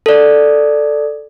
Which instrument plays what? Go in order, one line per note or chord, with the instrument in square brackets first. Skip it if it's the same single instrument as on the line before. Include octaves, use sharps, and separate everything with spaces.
[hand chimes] A4 D5